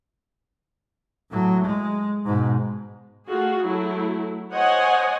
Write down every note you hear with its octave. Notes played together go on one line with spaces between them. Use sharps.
A2 F#3
G#3
G#2 B2
A3 F4 F#4 G#4
F#3 A3 E4
C5 C#5 D#5 F#5 G#5